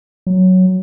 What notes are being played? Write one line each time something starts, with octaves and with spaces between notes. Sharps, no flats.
F#3